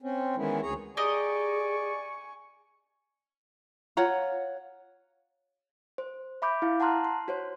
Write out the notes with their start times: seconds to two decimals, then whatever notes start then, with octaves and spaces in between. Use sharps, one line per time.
0.01 C4 C#4
0.37 D#3 E3 G#3 B3 C#4 E4
0.62 D2 G#4 C#5 A#5
0.97 G4 G#4 A#4 D5 D#5 G#5 C#6
3.97 F4 C#5 F#5 A#5
5.98 C5
6.42 E5 B5 D6 G6
6.62 E4 F5
6.80 F#5 A5 A#5 C6 F6 F#6
7.05 C6
7.28 F#4 C5 C#5